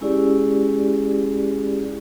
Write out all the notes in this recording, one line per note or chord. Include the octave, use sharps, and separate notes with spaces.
G#3 C#4 E4 G4 G#4 D5